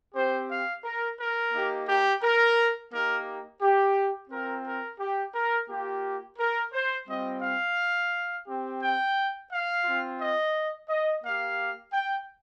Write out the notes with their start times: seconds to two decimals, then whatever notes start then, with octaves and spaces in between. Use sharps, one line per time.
0.15 C4 G4 C5
0.49 F5
0.84 A#4
1.18 A#4
1.53 A#3 D#4 G4
1.88 G4
2.22 A#4
2.92 A#3 D#4 G4 A#4
3.61 G4
4.30 C4 F4 A#4
4.65 A#4
4.99 G4
5.34 A#4
5.69 A#3 F4 G4
6.38 A#4
6.73 C5
7.07 G3 C4 F4 D#5
7.42 F5
8.46 C4 G4
8.81 G5
9.50 F5
9.84 C4 F4
10.19 D#5
10.89 D#5
11.23 A#3 G4 F5
11.93 G5